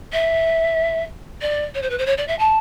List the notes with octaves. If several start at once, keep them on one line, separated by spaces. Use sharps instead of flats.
E5
D5
C#5
C5
B4
C5
C#5
D5
E5
A5